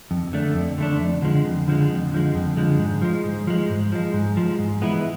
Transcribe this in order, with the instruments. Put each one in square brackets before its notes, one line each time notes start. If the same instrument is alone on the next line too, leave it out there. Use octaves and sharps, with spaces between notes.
[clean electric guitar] F2
D3 A3 D4
F2
D3 A3 D4
F2
D3 F3 G#3
F2
D3 F3 G#3
F2
D3 F3 G#3
F2
D3 F3 G#3
G#2
F3 G#3
G#2
F3 G#3
G#2
F3 G#3
G#2
F3 G#3
G#2
E3 G#3 B3 E4